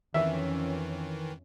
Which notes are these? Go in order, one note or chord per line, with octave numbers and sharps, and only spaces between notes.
F2 D#3 E3 C#4 E5